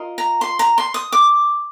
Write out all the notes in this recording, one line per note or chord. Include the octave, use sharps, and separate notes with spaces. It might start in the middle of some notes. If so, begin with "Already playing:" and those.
Already playing: F4 A#4 D#5
A#5
C6
A#5
C6
D#6
D6